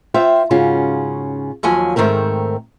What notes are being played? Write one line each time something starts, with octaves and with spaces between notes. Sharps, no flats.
F4 C5 E5 G5
G#2 C#3 C#4 F4 F#4
D#2 F3 F#3 G#5
G#2 D#3 A3 C4 A#4